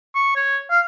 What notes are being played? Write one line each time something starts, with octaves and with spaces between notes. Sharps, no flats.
C#6
C#5
F5